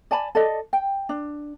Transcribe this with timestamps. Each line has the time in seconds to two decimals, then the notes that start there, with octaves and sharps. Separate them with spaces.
0.11 D5 G#5 A5 B5
0.35 A4 D5 D#5
0.73 G5
1.09 D4